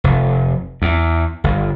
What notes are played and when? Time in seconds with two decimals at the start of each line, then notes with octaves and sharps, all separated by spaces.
0.04 F1
0.82 E2
1.44 G1